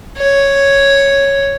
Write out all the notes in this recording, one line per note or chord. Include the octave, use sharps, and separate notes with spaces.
C#5